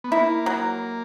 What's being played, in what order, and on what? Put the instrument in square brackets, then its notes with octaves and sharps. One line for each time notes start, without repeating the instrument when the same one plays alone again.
[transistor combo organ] B3
[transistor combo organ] A#3 [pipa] E4
[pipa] F#3